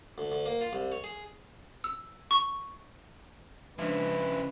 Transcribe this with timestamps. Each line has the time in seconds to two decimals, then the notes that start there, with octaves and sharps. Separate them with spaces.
0.18 D2
0.32 D2
0.46 A#3
0.61 F4
0.73 C2
0.92 C#5
1.04 G#4
1.84 E6
2.31 C#6
3.78 C#3 F3 G#3 D4 E4 B4